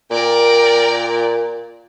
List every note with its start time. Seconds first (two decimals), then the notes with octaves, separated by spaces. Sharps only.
0.11 A#2 A#4 D5 G5